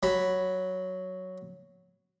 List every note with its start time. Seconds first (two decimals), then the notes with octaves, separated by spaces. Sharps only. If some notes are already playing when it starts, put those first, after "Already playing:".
0.03 F#3 B5